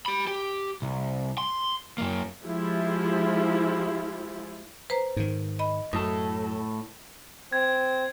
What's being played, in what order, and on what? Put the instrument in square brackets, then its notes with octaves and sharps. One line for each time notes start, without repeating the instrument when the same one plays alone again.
[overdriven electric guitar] G4 B5
G4
C2
C6
F#2 A#3
[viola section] F3 G#3 E4 F4 G4
[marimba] B4 C5 A#5
[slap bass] G#2 D#3
[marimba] D#5 B5
[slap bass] F#2 [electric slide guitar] A2 A4 [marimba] D#6
[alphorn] C4 [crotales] G#6